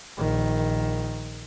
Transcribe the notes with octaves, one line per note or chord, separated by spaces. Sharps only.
A#1 D#3